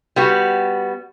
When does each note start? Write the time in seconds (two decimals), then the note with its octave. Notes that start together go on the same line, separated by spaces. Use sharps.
0.16 G3 B3 F#4